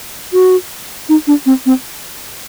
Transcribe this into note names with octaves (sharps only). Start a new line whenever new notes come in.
F#4
D#4
D4
C4
C4